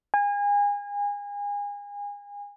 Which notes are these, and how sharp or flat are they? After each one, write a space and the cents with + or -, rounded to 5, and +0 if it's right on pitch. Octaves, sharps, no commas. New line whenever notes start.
G#5 -30